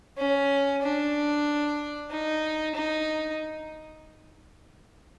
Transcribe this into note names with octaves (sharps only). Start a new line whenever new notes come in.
C#4
D4
D#4
D#4